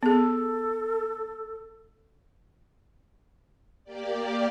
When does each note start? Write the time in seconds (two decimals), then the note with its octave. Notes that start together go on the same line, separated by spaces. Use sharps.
0.03 B3 G#4 A4
3.84 A#3 G4 D5